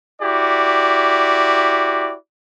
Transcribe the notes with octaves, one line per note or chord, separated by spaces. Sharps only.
E4 F#4 G4 D5